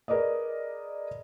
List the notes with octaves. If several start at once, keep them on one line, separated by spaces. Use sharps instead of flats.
G#4 A#4 B4 D5 D#5